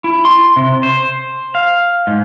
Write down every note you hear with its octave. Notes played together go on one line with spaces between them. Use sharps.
E4
C6
C3
C5
F5
G#2